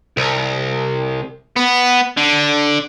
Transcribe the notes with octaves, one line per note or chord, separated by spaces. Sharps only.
C2
B3
D3